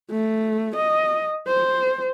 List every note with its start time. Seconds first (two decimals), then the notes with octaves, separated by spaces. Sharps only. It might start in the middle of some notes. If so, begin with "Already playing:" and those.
0.11 A3
0.76 D#5
1.47 C5